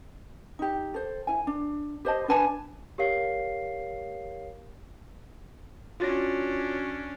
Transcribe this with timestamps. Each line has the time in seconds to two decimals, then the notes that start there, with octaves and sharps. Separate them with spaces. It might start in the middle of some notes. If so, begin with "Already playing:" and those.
0.59 D#4 G4
0.94 A4 C5
1.27 E4 G#5
1.47 D4
2.05 G4 C5 D#5 A5
2.28 D4 B4 G#5 A5
2.98 G4 A#4 C#5 F5 C7
6.00 C#4 D4 F4 F#4 C#5 A6 A#6